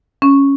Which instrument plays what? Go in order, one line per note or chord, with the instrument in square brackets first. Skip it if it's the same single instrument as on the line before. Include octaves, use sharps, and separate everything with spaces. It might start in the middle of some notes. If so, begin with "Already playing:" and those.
[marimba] C#4